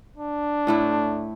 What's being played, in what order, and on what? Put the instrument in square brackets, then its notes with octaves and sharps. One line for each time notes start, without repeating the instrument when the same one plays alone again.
[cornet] D4
[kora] A2 A3 E4